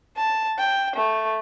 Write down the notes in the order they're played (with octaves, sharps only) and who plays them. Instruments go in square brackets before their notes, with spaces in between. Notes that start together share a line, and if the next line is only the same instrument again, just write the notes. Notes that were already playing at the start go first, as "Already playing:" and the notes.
[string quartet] A5
G5
A3